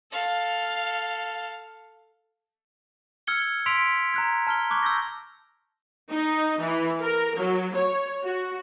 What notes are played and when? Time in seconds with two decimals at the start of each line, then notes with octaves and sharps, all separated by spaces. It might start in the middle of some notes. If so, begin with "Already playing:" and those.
0.12 A4 F5
3.27 E6 F6 G#6 C#7 G7
3.66 C6 E6 B6 D7 F7
4.14 A#5 F#6 G#6
4.47 A5 F6 G7
4.70 C#6 D6 F#6 G#6 G7
4.83 E6 G6 A#6
6.10 D#4
6.60 E3
7.02 A#4
7.38 F#3
7.75 C#5
8.24 F#4